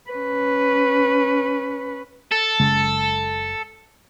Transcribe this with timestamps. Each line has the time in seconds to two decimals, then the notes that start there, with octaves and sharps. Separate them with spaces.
0.10 C#4 B4
2.32 A4
2.60 F#1 C#3 G#3